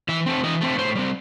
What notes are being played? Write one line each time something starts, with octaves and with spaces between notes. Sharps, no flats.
E3 E5
A3 C4
E3 D#5
A3 C4
A2 C5
G3 C4